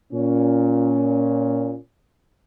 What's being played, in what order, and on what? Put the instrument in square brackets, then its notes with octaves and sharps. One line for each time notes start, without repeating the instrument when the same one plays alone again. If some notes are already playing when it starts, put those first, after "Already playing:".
[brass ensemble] A#2 C#4